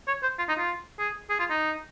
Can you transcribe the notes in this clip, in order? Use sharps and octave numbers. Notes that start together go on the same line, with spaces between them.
C#5
C5
F4
D#4
F4
G#4
G#4
F4
D#4